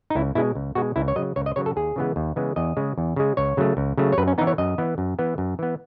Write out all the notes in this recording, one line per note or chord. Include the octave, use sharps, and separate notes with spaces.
D#4
C#2 E4
B2 G#3 E4
C#2
B2 G#3 F#4
C#2 E4
C#5
C#3 F#3 D#5
C#2 C#5
D#5
C#3 F#3 C#5
A4
D#2 G#4
C#3 E3 G#3 B3
D#2
C#3 E3 G#3 B3
E2 D#5
C#3 G#3
E2
C#3 G#3
C#2 C#5
C#3 F#3 A3
C#2
C#3 F#3 A3
C#5
F#2 B4
C#4
E3 B3 D#4
C#5
F#2 D#5
E3 B3
F#2
E3 B3
F#2
E3 B3